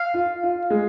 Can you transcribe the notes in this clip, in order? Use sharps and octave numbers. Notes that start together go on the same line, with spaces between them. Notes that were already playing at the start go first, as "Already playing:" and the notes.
Already playing: F5
F4
F4
G#3